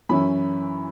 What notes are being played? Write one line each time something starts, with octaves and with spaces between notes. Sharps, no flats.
F#2 E3 C#4 E4 B5